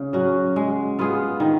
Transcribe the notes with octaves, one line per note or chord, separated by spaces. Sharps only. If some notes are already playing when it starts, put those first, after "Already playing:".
Already playing: C#3
F#3 C#4 F#4
G#3
B3 F4 G#4
D#3